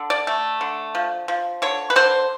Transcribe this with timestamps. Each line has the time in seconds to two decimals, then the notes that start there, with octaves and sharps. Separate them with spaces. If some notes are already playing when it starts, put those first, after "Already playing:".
Already playing: D3
0.10 D5
0.27 A3
0.61 D3
0.95 F3
1.28 F3
1.62 D3 C#5
1.90 B4
1.96 D3 C5